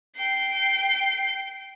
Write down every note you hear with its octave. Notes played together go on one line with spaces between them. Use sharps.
G5 C7